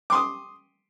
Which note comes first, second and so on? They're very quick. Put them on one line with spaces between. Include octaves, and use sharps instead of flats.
D6 C6 D#6